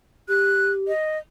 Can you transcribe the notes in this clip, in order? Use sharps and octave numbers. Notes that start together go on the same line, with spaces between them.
G4 F#6
D#5